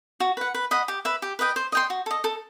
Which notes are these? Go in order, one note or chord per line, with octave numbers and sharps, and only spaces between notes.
F#4
B4 F#5
B4
D#5 F#5 B5
G4
B4 E5 B5
G4
B4 D#5 G5
C5
D#5 G5 C6
F#4
A4 D#5
A4